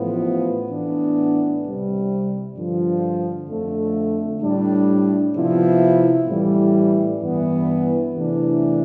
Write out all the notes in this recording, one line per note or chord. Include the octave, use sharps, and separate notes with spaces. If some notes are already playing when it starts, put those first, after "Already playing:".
Already playing: A1 A2 F3 B3
A2 E3 B3 D4
C2 C3 G3
G2 D3 F3
F2 D3 A3
A2 G3 D4
C3 F3 B3 E4
A1 A2 E3 G3
G2 E3 B3
E2 C3 E3 A3 D4